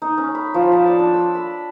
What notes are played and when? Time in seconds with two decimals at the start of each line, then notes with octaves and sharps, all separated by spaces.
0.02 D#4
0.18 C#4
0.35 B5
0.54 F3
0.72 A5
0.87 D5
0.99 D4
1.14 E6
1.35 B5